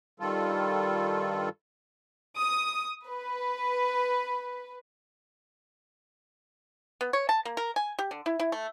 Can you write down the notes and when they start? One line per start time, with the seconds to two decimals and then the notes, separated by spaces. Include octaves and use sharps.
0.20 G2 D#3 G3 F4 A4
2.37 D#6
3.07 B4
7.01 B3
7.13 C#5
7.29 A5
7.45 A#3
7.57 A#4
7.76 G#5
7.99 G4
8.11 D3
8.26 E4
8.40 E4
8.52 A3